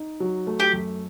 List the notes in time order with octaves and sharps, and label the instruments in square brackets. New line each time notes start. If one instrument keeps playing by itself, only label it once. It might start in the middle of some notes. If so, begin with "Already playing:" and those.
Already playing: [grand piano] D#4
F#3
A3
[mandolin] G4
[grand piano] F#2